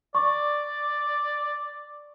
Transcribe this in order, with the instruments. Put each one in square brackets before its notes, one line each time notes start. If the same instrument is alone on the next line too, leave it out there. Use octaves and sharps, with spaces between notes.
[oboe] D5 [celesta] C#6